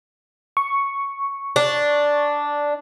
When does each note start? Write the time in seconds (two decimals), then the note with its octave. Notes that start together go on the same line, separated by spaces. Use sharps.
0.57 C#6
1.56 D4